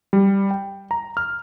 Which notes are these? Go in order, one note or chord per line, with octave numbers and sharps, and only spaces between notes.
G3
G5
A#5
F6